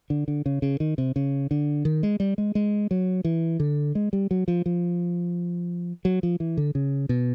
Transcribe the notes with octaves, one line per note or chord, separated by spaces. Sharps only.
D3
D3
C#3
C#3
D#3
C3
C#3
D3
D#3
G#3
G3
G#3
G#3
F#3
E3
D3
G#3
G3
F#3
F3
F3
F#3
F3
E3
D3
C#3
B2